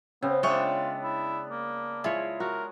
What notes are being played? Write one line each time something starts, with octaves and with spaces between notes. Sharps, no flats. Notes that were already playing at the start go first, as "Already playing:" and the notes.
C#3 B3 C4
G#3 B3 D4 F4 C#5 E5 G5
E4
A#3
G#3 E4 F4 C#5
F#4 A#4